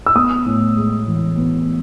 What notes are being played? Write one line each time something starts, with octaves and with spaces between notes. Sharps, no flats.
E6
B3 D#6
A2
G#3
E3
B3